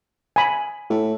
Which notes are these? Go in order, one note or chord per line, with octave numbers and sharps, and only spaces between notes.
G#5 B5
A2